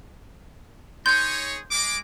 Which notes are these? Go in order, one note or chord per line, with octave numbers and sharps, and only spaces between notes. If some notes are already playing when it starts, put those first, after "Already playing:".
D#4 G#4 C#5 C6 G6
G#3 D6